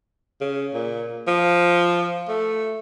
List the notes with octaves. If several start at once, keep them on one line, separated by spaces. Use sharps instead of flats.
C#3
A#2
F3
A3